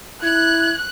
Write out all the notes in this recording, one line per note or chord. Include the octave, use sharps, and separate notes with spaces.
E4 F#6 G#6